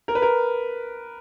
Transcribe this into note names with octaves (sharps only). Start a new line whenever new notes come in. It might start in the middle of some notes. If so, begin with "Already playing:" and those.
A#4
B4
A#4